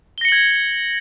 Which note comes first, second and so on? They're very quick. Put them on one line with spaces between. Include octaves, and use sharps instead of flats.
G7 A#6 C#7 F#7 G#6